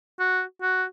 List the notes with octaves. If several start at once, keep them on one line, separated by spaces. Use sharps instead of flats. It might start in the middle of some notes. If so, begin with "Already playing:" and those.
F#4
F#4